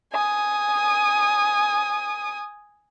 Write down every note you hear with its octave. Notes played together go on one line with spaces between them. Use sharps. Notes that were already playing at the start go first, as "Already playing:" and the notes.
G#5 D#6